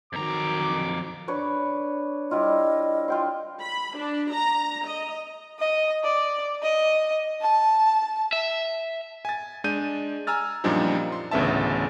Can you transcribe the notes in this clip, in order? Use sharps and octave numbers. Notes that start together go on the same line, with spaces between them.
F2 D#3 F#3 A#5 D6
D4 B4 C#5
G3 E4 F4 D#5
F4 G5 C6
B5
D4
A#5
D#5
D#5
D5
D#5
A5
E5
G#5 A6
G#3 D4 G6 D#7
G#5 A#5 E6 F6 A6
F#2 A#2 F3 G3 D4 D#4
C6
A1 D2 C#3 B3 E5 A5